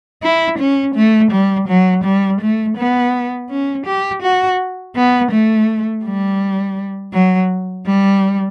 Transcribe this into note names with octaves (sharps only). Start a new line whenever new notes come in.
E4
C#4
A3
G3
F#3
G3
A3
B3
C#4
G4
F#4
B3
A3
G3
F#3
G3